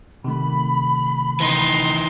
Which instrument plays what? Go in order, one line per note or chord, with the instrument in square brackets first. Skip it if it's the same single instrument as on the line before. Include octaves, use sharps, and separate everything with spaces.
[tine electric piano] C3 D#3 A3 [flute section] B5
[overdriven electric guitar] E3 D#4 [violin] A#5 C6